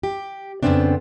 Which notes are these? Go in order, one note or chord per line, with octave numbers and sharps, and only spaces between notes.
G4
F2 C#3 G3 B3 C4 D4